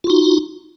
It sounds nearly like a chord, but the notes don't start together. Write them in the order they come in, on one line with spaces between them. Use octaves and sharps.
F4 F#4 D#4